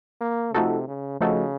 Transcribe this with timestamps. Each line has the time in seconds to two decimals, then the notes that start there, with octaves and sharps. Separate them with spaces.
0.21 A#3
0.53 C3 F3 A3 D#4 F#4 A4
0.88 C#3
1.21 C#3 F3 A3 D#4 F#4 A4